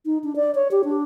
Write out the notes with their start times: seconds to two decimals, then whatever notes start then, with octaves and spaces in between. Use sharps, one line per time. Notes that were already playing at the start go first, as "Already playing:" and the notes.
0.05 D#4
0.24 D4
0.36 D5
0.55 C#5
0.71 G4
0.84 D4